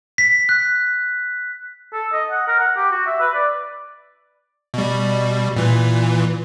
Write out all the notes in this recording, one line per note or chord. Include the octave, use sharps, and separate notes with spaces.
B6
F#6
A4
D#5
F#5
A#4
F#5
G4
F#4
E5
B4
D5
B2 G3
A#2 E3